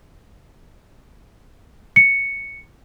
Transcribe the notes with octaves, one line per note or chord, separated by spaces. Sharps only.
C#7